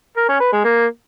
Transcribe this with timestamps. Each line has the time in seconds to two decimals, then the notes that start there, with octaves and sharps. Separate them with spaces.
0.17 A#4
0.29 C#4
0.41 B4
0.52 G#3
0.64 A#3